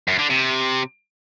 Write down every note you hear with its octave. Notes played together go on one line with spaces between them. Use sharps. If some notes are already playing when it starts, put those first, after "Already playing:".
F#2
D3
C3